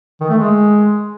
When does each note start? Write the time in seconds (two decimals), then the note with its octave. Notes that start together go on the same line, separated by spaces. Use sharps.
0.21 D#3
0.29 A3
0.38 G#3